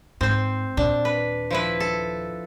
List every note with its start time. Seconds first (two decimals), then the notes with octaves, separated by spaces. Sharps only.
0.21 G#2 C4 C5
0.77 D#2 A#2 D4
1.05 B4
1.50 F3 E4 B4
1.80 A4